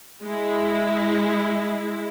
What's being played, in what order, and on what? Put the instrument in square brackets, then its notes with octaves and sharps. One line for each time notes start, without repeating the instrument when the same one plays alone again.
[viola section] G#3 E4